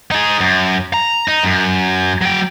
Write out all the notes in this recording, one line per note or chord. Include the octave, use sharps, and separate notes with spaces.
D#4 G#4
F#2
A#5
D#4
F#2
F#3 G5